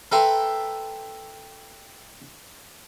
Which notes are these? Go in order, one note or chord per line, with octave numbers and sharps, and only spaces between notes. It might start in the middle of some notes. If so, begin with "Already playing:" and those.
A4 B4 E5 G5 A#5 C6